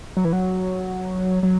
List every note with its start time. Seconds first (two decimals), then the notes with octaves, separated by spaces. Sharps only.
0.17 F#3
0.25 E3
0.33 F#3
1.43 F#3